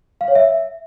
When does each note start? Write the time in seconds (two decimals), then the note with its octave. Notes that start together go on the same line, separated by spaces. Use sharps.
0.21 F5
0.28 C#5
0.35 E5